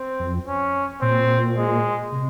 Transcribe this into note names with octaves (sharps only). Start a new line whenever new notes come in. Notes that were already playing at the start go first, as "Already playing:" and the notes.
Already playing: C4
F2
C#4
A#2 C4
G#3
C3